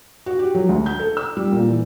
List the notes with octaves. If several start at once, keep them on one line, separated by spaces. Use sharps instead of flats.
F#4
G4
F#3
D2
G6
A4
E6
G3
A#2
E3